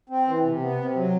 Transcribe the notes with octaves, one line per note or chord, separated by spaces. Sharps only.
C4
E3
C3
B3
C3
F#3